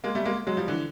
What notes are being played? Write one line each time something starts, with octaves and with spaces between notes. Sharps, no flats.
G#3 A#3
G3 A3
G#3 A#3
F#3 G#3
F3 G3
D3 E3